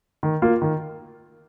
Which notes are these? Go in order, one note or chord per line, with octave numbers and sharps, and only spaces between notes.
D#3
A#3 F4
D#3